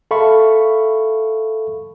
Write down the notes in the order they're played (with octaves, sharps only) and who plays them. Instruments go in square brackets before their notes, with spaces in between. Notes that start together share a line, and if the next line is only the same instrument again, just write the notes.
[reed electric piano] A4 E5 F5 B5 C#6